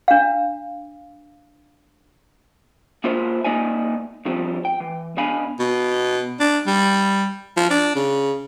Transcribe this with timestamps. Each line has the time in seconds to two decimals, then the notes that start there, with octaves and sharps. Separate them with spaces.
0.08 D4 F5
3.04 A#3 E4 F4 A#4 C5 E5
3.44 C2 A#3 D#4 D5 E5 G#5
4.25 G2 F3 G3 C4
4.65 G5
4.80 E3
5.17 B2 D4 F5 G#5 B5
5.59 B2
6.40 D4
6.67 G3
7.57 F3
7.70 D4
7.96 C#3